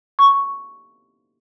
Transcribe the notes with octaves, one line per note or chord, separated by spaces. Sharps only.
C#6